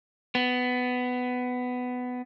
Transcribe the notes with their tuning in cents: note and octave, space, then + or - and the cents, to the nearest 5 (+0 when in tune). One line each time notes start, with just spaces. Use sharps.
B3 +15